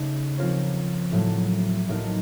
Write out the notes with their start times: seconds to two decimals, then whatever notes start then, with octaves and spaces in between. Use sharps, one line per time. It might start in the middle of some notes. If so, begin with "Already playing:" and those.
Already playing: C#3 A3 D#4
0.38 F3 C4 F4 A#4 C#5
1.12 A2 F#3 A#3
1.89 A2 F#3 A#3 D#4 A#4